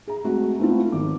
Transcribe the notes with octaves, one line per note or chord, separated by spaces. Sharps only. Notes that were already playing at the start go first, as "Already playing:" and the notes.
G#4 A#5
G#3 A3 C4 F#4 G#4
A3 B3 C4 E4 F4
G#1 D6